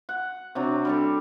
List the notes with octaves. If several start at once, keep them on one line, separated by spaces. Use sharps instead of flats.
F#5
C3 F#3 D4
G3 D4 A4